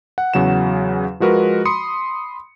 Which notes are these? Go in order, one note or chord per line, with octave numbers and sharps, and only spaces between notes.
F#5
E2 C#3 F#3 F#5 E7
F3 G#3 F#4 A#4 B4
B5 C6 D#6 C#7